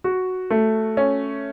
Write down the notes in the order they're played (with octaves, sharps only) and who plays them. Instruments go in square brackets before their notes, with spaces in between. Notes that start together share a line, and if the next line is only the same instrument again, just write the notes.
[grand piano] F#4
A3
C#4